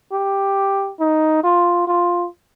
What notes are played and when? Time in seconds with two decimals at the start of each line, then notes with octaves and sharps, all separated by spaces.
0.12 G4
1.00 D#4
1.44 F4
1.88 F4